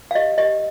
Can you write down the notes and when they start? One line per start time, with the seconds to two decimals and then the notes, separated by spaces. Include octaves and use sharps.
0.11 F5
0.15 G4 D#5
0.38 G4 D#5